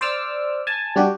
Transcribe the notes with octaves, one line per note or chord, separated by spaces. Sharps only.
C5 D5 D6 E6 F6
G#5 A5
G3 D4 F#4 G4